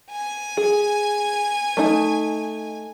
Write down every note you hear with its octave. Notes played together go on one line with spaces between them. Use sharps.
G#5
G#4
A3 D#4